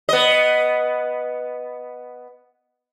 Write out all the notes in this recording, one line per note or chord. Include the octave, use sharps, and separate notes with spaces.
B3 D#5